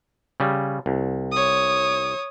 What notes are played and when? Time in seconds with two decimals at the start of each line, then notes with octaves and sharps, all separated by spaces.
0.40 C#3 G3
0.86 C2
1.32 C#5 D#6